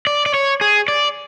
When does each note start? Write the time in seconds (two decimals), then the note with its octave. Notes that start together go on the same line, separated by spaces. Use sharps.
0.07 D5
0.26 D5
0.34 C#5
0.61 G#4
0.88 D5